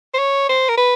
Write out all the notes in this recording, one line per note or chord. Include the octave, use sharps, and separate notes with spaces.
C5
C#5
C5
A#4
B4